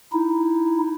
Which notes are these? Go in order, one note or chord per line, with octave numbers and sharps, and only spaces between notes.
D#4 E4